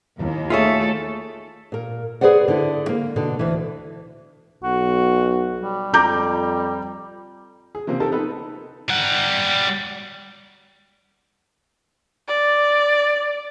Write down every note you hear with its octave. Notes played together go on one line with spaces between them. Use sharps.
D#2 E4
A3 F4 G#4 A4 C#5 E5
A#2 A#4
G#4 B4 C5 D5 F#5
D3 E4
A#3
B2 D3
D2 E3
B1 F#4
G3
F2 A#5 D6 G6
G#4
C3 F3 A#3 C4
D#4 G4 A4 A#4 A5
B3 D#4 A4 B4
G3 F#5
D5